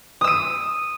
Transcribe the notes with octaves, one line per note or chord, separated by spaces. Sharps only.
D#6 E6 D#7